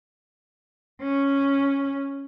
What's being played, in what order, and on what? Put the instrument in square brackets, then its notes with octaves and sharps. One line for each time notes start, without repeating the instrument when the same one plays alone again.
[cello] C#4